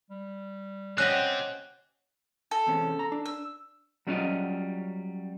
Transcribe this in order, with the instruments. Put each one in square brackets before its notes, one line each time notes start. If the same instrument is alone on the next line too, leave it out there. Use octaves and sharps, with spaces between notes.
[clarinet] G3
[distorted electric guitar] C4 G4 [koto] C#4 D#5 F#5 [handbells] F#6
[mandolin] A4
[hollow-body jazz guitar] E2 C3 C#4
A#5
D4
[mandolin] E6
[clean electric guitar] F#3 G3 C#4 D4 F4 D#5